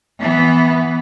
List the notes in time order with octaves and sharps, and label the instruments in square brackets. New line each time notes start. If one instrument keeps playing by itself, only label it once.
[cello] E3 B3